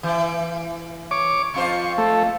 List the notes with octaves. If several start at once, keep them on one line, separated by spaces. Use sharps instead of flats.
E3
C#5 D6
F2 F4 C5 C#6
A3